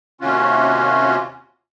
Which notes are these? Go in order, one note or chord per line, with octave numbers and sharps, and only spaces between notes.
D#2 C3 C#4 F4 F#4